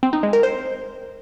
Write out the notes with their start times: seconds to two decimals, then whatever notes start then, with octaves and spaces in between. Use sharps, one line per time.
0.03 C4
0.13 D#4
0.23 G#3
0.33 A#4
0.43 C5